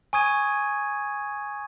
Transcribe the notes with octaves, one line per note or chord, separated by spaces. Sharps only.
G#5 C#6 D#6 G#6 D#7